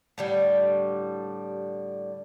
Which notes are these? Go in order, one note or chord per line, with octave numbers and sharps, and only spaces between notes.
A2 D3 G3